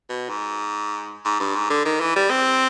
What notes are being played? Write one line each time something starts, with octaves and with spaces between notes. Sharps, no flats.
B2
G#2
G#2
G2
G#2
D3
D#3
E3
G3
C4